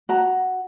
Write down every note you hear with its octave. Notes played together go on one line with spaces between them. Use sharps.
F#4 A#5